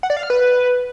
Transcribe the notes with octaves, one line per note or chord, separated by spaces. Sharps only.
F#5
D5
F5
F6
B4